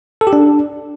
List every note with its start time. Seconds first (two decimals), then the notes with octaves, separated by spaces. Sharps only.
0.21 A4
0.27 G4
0.33 D4